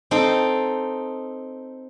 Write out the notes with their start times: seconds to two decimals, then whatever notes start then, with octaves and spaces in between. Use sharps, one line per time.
0.11 C4 D#4 A4